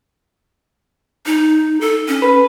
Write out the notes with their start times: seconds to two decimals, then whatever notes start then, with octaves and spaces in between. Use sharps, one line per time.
1.26 D#4
1.81 A4
2.08 C#4
2.22 B4